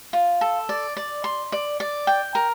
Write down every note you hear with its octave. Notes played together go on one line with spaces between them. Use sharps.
F4
A4
D5
D5
C6
D5
D5
G5
A#4